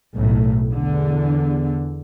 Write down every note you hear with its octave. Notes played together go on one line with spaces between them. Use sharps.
B1 A2
E2 D3